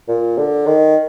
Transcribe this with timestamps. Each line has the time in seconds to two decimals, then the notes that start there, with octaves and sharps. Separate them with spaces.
0.09 A#2
0.38 D3
0.67 D#3